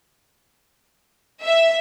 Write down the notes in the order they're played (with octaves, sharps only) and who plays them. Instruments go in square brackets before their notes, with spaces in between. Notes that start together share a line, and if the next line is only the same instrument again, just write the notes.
[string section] E5